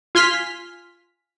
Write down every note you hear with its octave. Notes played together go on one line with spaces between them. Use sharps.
F4 G#5 C6 F6 B6